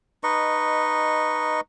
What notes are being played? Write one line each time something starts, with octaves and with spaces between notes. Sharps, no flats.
D#4 B4 D#5 C#6